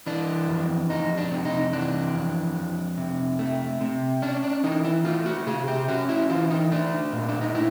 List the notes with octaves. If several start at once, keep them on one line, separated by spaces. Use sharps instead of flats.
E3 D4
F2
F2 D#4
D4
C3
D#4
E3 D4
F2
F2
C3
A3
C3
C#4 D4
D4
E3 D#4
E4
A3 F4
F#4
C3 G#4
G4
C#4 F#4
E4
E3 F4
D#4
A3 D4
A#2
D4
D#4
A#2 E4